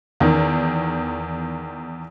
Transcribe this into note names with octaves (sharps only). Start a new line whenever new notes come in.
E2 D#3